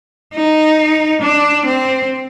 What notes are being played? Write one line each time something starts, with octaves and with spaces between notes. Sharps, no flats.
D#4
D4
C4